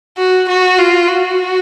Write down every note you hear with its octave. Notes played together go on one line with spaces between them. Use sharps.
F#4
F#4
F4
F#4